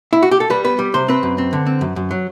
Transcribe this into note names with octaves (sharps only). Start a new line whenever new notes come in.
E4
F#4
G4
A4
G3 B4
B3 B4
G3
C3 C5
C4 B4
F#2
C4
D3
C4
F#2
F#2
F#3